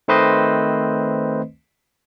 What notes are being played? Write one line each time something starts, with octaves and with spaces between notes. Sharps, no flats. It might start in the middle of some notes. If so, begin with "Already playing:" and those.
D#3 A3 C4 B4 C5 D#5